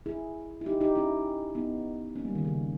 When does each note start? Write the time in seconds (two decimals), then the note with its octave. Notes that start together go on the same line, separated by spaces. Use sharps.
0.06 E4 G#4
0.61 E4
0.66 D#4 G4
0.81 D#4 G4
0.95 C#4 E4
1.55 B3 D#4
2.16 A#3 C#4
2.25 G3
2.35 D#3
2.45 C#3